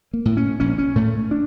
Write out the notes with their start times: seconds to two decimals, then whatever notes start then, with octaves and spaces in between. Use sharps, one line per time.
0.13 A#3
0.25 A2
0.37 C#4
0.60 A#1 C#4
0.78 C#4
0.96 A2 A3
1.31 D4